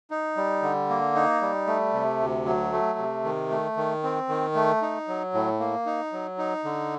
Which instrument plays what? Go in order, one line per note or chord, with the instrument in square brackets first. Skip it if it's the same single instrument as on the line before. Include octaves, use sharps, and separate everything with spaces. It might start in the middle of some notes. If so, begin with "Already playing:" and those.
[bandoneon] D#4
G3
D3
A#3
D#4
G3
A3
C3
D2
F#3
A3
C3
D#3
A3
D#3
C4
D#3
A3
D#4
F#3
A2
A#3
D#4
F#3
D#4
D3